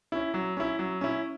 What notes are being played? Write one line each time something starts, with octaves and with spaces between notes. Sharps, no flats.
C#4 E4
F#3
C#4 E4
F#3
C#4 E4